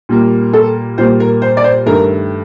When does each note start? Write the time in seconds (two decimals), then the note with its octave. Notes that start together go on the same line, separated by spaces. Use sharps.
0.09 A#2 G3 A#3
0.53 A4
0.98 A#2 G3 A#3 C5
1.20 A#4
1.42 C5
1.57 D5
1.64 C5
1.86 G2 D#3 A3 A#4